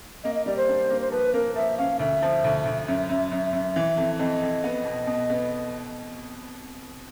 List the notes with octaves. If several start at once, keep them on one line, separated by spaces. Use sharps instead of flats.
A#3 D#5
D#5
G3 D5
C5
D4
A#3
C5
F3 B4
A#3 A#4
F3 E5
C#4 F5
D2 E5
F3
D2
D2
F#2 E5
F#2 E5
F#2 E5
F#2
E3
F2
F2 D#5
F2
B3
B2
B2
B3